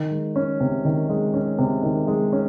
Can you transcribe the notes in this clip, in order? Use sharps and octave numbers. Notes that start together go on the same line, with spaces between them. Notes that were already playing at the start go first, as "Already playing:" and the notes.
Already playing: D#3
G#3
C#4
C3
D#3
G#3
C#4
C3
D#3
G#3
C#4